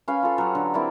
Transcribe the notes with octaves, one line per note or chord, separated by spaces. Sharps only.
C#4 B4 F5
F4 A4
F#3 G4
D3
C4 E4 A#4 D5